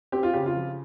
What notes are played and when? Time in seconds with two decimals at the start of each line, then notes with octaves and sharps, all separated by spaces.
0.12 C4 G4
0.23 F4
0.33 C#3 G4
0.46 F4
0.56 F3